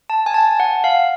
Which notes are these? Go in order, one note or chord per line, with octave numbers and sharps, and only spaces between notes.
A5
G#5
A5
F#5
F5